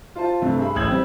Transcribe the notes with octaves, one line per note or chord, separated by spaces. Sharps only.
F4 C5 A5
G2 C3 A3
G#4 E5 B5
A1 C#3 G4 E6 G#6 F#7
G3 C4